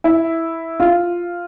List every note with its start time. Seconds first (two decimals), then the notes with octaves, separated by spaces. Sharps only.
0.04 E4
0.80 F4